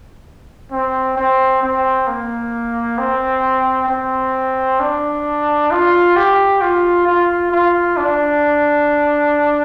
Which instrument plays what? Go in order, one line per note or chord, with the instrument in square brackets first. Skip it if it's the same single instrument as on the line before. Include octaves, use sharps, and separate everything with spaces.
[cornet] C4
C4
C4
A#3
C4
C4
D4
F4
G4
F4
F4
F4
D4